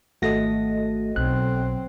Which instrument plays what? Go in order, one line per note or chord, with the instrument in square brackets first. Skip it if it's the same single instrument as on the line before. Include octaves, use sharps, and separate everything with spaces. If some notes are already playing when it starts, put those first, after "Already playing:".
[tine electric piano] G#1 A3 A#6 [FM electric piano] F#4 A4 D#5
[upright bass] B1 [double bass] F#3 C4 [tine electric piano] F#6